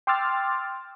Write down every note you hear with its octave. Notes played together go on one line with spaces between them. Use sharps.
G5 C6 D6 E6 F6 A6